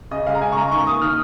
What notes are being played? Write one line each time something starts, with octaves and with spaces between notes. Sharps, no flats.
C#3 D#5
G#3 F5
A#5
C#3 G#5
C#6
G#3 A#5
D#3 C#6
A#3 D#6
D#3 F6